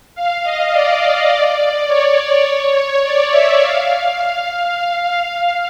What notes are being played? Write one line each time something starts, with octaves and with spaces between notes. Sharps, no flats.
F5
D#5
D5
C#5
D5
E5
F5
F5